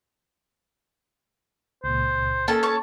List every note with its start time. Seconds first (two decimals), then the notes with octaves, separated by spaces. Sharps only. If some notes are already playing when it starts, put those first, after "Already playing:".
1.84 C#2 A#2 C5
2.48 A#3 C#4 A4 A5
2.63 C#5 A5